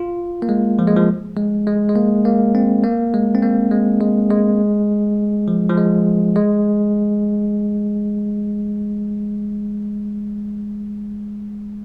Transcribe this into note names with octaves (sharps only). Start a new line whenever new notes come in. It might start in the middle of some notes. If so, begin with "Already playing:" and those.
Already playing: F4
A#3
G#3
F3
G#3
F3
G#3
G#3
G#3
A#3
A#3
C4
A#3
G#3
C4
A#3
G#3
G#3
G#3
F3
F3
G#3
G#3